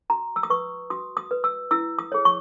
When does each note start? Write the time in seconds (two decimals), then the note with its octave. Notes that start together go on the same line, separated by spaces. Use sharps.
0.10 F#4 A#5
0.36 E6
0.43 D#6
0.50 B4 C#6
0.90 F#4 D#6
1.17 D#6
1.31 B4
1.44 E6
1.71 E4 E6
1.99 D#6
2.12 G#4 C#5
2.25 C#6